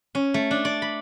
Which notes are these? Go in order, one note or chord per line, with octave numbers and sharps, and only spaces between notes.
C#4
A3
D4
D5
B5